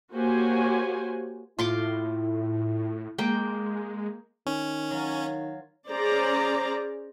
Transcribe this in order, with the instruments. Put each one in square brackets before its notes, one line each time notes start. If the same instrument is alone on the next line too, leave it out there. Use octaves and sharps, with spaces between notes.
[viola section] A#3 F#4 G4 C5 C#5 G#5
[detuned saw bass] A2 [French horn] E4 [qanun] F4 C6 D6
[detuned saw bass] G#3 [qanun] A#3 G5
[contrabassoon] D#3 [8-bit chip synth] C#4
[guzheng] F#3 F4
[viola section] C#4 G#4 C5 D5 A#5